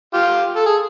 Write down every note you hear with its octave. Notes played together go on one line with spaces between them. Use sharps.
F4 G4
A4
G#4